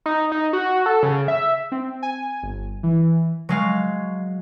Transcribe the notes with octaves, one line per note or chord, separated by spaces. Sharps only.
D#4
D#4
F#4
A4
C#3
E5
C4
G#5
G1
E3
F#3 G#3 F5